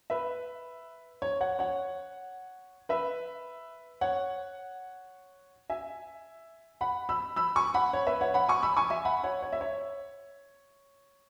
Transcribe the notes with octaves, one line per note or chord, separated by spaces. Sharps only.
B4 E5
C#5
C#5 F#5
C#5 F#5
B4 E5
C#5 F#5
E5 G#5
F#5 B5
B5 E6
B5 E6
G#5 C#6
F#5 B5
C#5
B4 E5
C#5 F#5
F#5 B5
G#5 C#6
B5 E6
G#5 C#6
E5 G#5
F#5 B5
C#5 F#5
C#5
E5
C#5